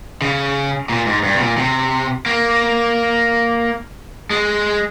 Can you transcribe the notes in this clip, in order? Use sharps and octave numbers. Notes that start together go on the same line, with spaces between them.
C#3
A#2
G#2
G2
C3
A#2
C3
A#3
G#3